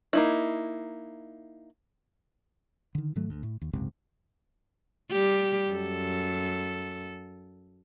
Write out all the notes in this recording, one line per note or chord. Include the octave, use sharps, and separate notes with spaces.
A#3 D#4 E4
D3 D#3
G#2 D#3 F#3 A3
D2
A2
D#2
F#1 C#2 G#2 C3
G3 G4
F#2 A4